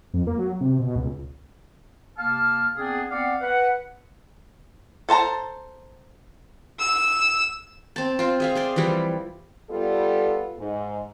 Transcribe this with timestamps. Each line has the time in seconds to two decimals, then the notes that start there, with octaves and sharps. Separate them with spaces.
0.14 F2
0.27 A#3
0.38 F#3
0.61 C3
0.79 B2
0.96 C#2
2.18 C3 A#3 F5 A5 F6
2.77 B3 C4 D4 G#4
3.10 B3 C4 D5 F5 F#5
3.40 B4 F#5
5.09 A4 C5 A5 A#5
6.79 E6
7.96 C4 A5
8.19 C4 F4
8.40 G#4 E5 F5
8.55 G#4 C5 D5
8.76 E3 F3 G3 E4
9.70 G3 B3 F4 G4 A4
10.58 G#2